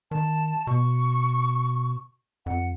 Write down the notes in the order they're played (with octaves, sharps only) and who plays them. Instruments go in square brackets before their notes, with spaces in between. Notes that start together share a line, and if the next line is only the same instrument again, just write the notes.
[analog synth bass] D#3 [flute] A5
[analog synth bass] B2 [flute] C#6
[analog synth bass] F2 [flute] F#5